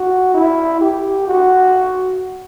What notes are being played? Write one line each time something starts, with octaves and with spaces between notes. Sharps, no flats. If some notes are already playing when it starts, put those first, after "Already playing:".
Already playing: F#4
E4
G4
F#4